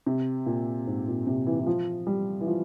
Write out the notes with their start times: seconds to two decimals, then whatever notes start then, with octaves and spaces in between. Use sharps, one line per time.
0.06 C3
0.46 A#2
0.87 G#2
1.07 A#2
1.27 C3
1.47 E3
1.60 E3
1.66 F3
2.07 G3
2.41 E3
2.47 F3